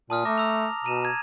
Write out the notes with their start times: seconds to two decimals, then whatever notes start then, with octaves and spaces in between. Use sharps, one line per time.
0.10 A#2 A5 D#6 F6
0.25 A3 A#5 D6 A#6
0.38 A#5 E6 F7
0.84 B2 A#5 D#7 E7
1.05 G#6